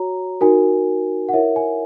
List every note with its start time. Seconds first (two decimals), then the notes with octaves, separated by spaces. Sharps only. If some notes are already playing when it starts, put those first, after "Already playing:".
Already playing: F#4 C#5 A#5
0.41 D#4 F#4 A#4 G#5
1.29 F#5
1.33 E4 A#4 C#5 E5
1.56 G#5